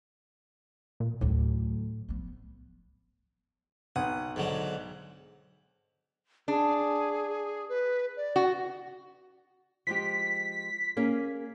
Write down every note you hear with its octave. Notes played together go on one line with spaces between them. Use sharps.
A#2
D2 A2 F#3
F3 B3
B1 F#5 D#6
G#2 D3 F#3
D4 G#4
B4
D5
F#4
F3 G#3 G4 B6
A#3 C#4 G#4